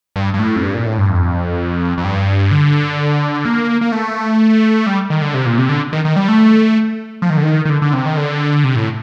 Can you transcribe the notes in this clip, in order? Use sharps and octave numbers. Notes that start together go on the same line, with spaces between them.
G2
G2
A2
F2
G2
A#2
A2
G2
F2
F2
G2
D3
A#3
A#3
A3
G3
D#3
D3
C3
A#2
C3
D3
D#3
D#3
G3
A3
F3
D#3
D3
D#3
D#3
D3
D3
C3
D#3
D3
C3
A2